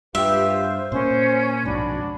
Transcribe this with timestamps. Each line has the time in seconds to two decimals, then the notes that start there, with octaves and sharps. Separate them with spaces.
0.15 G2 F4 G4 B4 E5
0.50 C5
0.92 A#2 A#3 C#4 C5
1.65 B1 F2 G#2 D4 F#4 B5